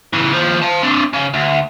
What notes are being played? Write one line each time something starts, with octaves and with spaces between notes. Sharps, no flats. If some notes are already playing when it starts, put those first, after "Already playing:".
C#3 E3
D#2 F3
F5 A5
C4 D4
C#3
D2